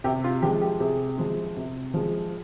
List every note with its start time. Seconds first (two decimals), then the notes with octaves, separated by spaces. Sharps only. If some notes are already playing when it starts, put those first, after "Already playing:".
0.04 C3 G4
0.24 F4
0.42 F3 G4
0.46 G#3
0.61 G4
0.80 C3 G#4
1.18 F3 G#3
1.57 C3
1.94 F3 G#3